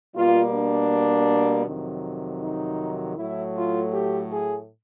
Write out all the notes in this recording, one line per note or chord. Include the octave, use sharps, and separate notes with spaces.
B2 G3 A#3 F4
D4
F2 C3 D#3 F#3
D#4
A2 F#3 A3 E4
F4
G4
G#4